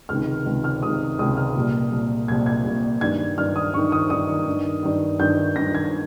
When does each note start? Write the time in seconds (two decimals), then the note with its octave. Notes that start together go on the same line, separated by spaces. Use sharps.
0.09 C#2 C3 D#3 F6
0.46 C#2 C3 D#3
0.64 F6
0.82 C#2 C3 D#3 D#6
1.19 C#2 C3 D#3 D#6
1.37 F6
1.55 C2 A#2
1.92 C2 A#2
2.28 C2 A#2 G#6
2.46 G#6
2.65 C2 A#2
3.01 G2 D#3 G#6
3.38 G2 D#3 F6
3.56 D#6
3.74 G2 D#3 C#6
3.92 D#6
4.10 G2 D#3 D#6
4.47 G2 D#3
4.83 G2 D#3
5.19 G2 D#3 G6
5.56 G2 D#3 A#6
5.75 G#6